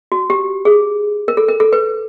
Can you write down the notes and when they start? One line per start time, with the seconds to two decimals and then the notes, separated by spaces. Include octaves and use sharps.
0.12 F#4
0.30 G4
0.65 G#4
1.28 A#4
1.37 A4
1.48 A#4
1.60 A4
1.73 B4